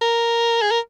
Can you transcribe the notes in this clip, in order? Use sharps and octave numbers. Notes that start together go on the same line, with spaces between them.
A#4
G#4
A#4